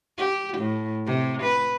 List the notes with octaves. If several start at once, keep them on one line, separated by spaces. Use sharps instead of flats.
G4
A2
C3
B4